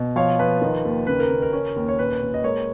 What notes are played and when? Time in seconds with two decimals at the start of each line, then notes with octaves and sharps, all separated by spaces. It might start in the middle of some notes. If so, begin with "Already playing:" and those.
Already playing: B2
0.16 F3 C#5 F5
0.39 F3 B4
0.62 D#3
0.85 D#2
1.07 C#3 B4
1.20 A#4
1.30 C#3
1.42 A#4
1.53 C#4
1.76 D#2
1.88 C#5
1.99 A#2 B4
2.22 A#2
2.34 D#5
2.43 G#3 A#4 C#5